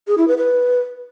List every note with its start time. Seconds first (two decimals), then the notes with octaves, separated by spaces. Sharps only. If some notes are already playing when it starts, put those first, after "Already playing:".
0.08 G#4
0.18 E4
0.28 B4
0.38 B4